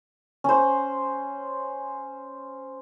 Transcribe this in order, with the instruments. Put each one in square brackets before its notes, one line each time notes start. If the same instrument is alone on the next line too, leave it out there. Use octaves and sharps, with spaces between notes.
[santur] C#4 C5